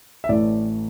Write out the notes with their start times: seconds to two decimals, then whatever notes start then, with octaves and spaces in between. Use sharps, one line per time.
0.24 E5
0.29 A1 A2 E3 A3 D5